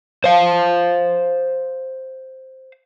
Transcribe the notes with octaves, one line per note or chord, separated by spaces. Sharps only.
C5 F5